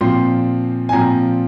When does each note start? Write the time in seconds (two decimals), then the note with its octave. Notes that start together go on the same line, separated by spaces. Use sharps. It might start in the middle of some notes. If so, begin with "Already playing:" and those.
0.01 A#2 F3 C4 C6
0.89 G#5
0.92 A#2 F3 C4 A#5